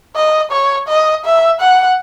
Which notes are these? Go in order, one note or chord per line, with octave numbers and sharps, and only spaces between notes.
D#5
C#5
D#5
E5
F#5